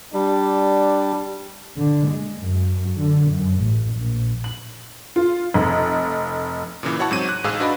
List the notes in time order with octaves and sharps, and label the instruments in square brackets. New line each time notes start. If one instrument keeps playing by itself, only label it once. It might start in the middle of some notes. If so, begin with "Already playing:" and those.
[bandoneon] G3 [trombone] D4
[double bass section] D3
G#3
F#2
D3
F#2
A1
A#1
[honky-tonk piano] F#7
F4
F1
[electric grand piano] A#2 C#3 E3
E4 F#4 C#5 F#5 A5 C#6
G#2 F#3 C4 D#7
F#6 D#7
A1 G#2 G#4 F5 E6
D4 F#4 B4 D5 D#5 B5